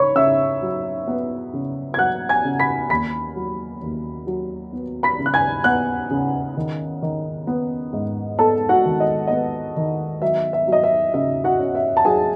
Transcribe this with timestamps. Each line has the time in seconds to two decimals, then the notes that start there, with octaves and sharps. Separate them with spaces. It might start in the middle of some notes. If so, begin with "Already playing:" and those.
Already playing: C#3 C#5 B5 C#6
0.15 C#3 E5 E6
0.62 F#3
1.08 B3
1.53 C#3
1.94 G#6
1.98 F#3 F#5 F#6
2.29 G#5 G#6
2.44 C#3
2.60 B5 B6
2.90 D#2 B5 B6
3.36 F#3
3.82 D#2
4.27 F#3
4.73 B3
5.03 B5 B6
5.19 C#3
5.26 F#6
5.34 G#5 G#6
5.64 B3 F#5 F#6
6.11 C#3
6.57 D#3
7.02 D#3
7.47 B3
7.93 G#2
8.39 B3 A4 A5
8.69 F#4 F#5
8.85 D#3
9.00 D#5
9.27 B3 D#5
9.76 D#3
10.22 F#3 E5
10.53 E5
10.67 F#3
10.73 D#5
10.83 E5
11.14 C#3 E5
11.44 F#4 F#5
11.59 C#4
11.75 E5
11.97 A5
12.05 F#3 G#4 G#5